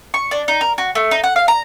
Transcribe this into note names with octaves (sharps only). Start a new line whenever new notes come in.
C#6
D4
D#4
A#4
F#4
A3
D#4
F#5
F5
A#5